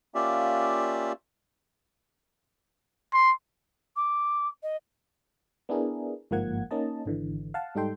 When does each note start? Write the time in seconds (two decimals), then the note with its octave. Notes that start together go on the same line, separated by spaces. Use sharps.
0.15 A#3 C#4 F4 G4 D5 E5
3.13 C6
3.96 D6
4.62 D#5
5.69 B3 D4 E4 G#4 A#4
6.31 G1 G#2 F3 A#3 F#5 G#6
6.71 A#3 C#4 D#4 D#5 A5
7.06 G#1 D3 E3
7.54 F5 F#5 A5
7.75 G#2 G3 D#4 A4 G5 C6